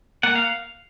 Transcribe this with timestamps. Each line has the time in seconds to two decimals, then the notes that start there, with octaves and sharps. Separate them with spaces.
0.23 A#3 F#5
0.35 F5